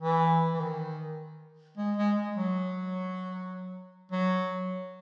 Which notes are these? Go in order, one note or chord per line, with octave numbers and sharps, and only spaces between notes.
E3
E3
D#3
G#3
G#3
G#3
F#3
F#3